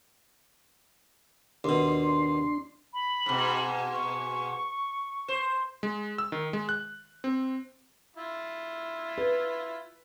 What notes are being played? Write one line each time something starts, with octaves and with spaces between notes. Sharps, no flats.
D#2 B2 D4 C6
B5
G#2 B2
C#6
C5
G#3
E6
D#3
G#3
F#6
C4
E4 F4
B4